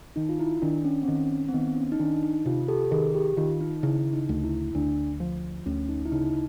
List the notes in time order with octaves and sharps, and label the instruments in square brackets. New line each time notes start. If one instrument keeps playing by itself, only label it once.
[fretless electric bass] D#3 [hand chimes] D#4
[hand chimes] F4
E4
[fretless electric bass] D#3 [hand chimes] D4
[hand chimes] C#4
C4
[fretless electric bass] D#3 [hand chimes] C#4
[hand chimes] C4
[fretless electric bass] D#3 [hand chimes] B3
[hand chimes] C#4
D#4
[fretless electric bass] D#3 [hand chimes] D4
[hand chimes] D#4
[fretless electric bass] C3 [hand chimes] F4
[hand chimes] G4 A4
[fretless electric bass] D#3 [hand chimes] G#4 A#4
[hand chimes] G4
[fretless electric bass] D#3 [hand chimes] F4
[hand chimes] D#4
[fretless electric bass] C#3 [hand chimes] E4
[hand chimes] D#4
[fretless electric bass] D2
[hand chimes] E4
[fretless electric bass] D2 [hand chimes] D4
[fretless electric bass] F3
[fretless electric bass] D2 [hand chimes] C#4
[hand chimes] D#4
E4
[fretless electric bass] C#3 [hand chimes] D#4